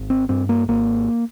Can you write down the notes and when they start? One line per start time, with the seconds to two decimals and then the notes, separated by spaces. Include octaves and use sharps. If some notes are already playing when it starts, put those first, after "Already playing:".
Already playing: G#1
0.10 C4
0.29 G2 C4
0.49 A#3
0.68 G#1 A#3